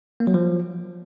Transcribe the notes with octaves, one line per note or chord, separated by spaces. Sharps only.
A#3
F#3
F3